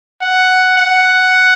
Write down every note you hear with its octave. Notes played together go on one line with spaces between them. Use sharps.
F#5
F#5